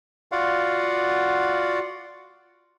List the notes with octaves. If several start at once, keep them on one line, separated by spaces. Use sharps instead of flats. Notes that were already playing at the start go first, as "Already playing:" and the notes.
F4 F#4 D5 F5 F#5